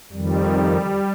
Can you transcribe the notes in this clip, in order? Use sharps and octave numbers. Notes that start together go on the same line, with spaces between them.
F2 D#3 G3